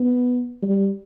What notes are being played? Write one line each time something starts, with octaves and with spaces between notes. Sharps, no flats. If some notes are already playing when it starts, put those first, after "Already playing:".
Already playing: B3
G3